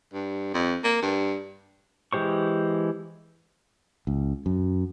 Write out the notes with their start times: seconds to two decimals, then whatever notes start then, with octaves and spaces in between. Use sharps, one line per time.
0.14 G2
0.54 F2
0.84 A#3
1.02 G2
2.13 E3 G#3 G4 C5 C#6
4.07 C#2
4.46 F#2